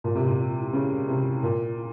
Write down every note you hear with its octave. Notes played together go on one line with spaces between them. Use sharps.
A#2
C3
A#2
C#3
C3
A#2